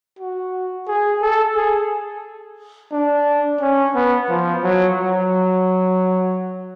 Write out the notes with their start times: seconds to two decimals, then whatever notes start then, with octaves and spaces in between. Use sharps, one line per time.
0.19 F#4
0.87 G#4
1.22 A4
1.55 G#4
2.92 D4
3.61 C#4
3.95 B3
4.29 F3
4.63 F#3
4.98 F#3